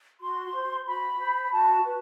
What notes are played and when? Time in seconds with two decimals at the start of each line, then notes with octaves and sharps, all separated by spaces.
0.20 F#4 C6
0.53 C5
0.86 F#4 B5
1.19 C5
1.44 B5
1.51 F#4 A5
1.84 B4